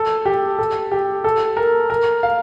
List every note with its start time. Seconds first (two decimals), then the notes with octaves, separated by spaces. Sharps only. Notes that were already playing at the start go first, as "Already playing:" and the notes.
Already playing: A4
0.25 G4
0.59 A4
0.91 G4
1.24 A4
1.57 A#4
1.90 A#4
2.23 F5